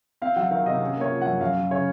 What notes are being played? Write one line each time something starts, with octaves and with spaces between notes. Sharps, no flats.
C4 F5
F#3 F#5
D#3 F5
C3 D#5
C#4
A#3
C#5
F3
F#2 F#5
F#2 F5
F#3
C#3 C#5